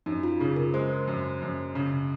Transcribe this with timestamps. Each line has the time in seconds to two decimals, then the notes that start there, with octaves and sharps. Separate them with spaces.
0.06 F#2 D#4
0.23 F4
0.40 C#3 G#4
0.56 A#4
0.74 G#3 C5
1.08 F#2
1.42 F#2
1.75 C#3